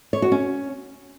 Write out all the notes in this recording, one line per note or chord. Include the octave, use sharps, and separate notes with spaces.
C#5
F#4
C#4